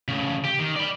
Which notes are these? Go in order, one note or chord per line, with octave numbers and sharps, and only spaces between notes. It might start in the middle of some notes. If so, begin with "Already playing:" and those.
A2 C#3
G4
D#3
D5 B5